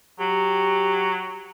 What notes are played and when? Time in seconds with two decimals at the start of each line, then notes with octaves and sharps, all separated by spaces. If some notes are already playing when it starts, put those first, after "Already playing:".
0.20 F#3 G4